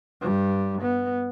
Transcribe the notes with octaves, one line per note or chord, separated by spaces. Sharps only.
G2 G3
B3